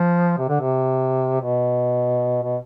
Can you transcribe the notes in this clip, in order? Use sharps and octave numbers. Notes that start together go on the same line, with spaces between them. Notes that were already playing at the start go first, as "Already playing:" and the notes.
Already playing: F3
C3
D3
C3
B2
B2